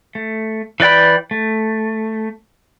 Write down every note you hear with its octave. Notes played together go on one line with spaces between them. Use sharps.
A3
E3 B4 D5 G5 B5
A3